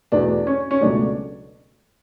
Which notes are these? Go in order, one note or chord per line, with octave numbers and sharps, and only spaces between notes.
E2 B2 A3 D4
C#4
C#4
C#2 B2 F#3 A3 D4